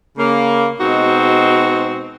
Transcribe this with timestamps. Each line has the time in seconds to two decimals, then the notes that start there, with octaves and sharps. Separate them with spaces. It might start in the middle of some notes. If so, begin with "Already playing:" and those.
0.18 C#3 A#3
0.80 B2 G#3 C4 D#4 F#4